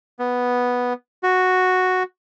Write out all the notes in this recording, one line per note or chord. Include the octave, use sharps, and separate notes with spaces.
B3
F#4